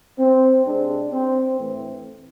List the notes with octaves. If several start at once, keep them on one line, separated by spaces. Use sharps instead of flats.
C4
C3 G#3 C4 D4
C4
A2 E3 A3 C4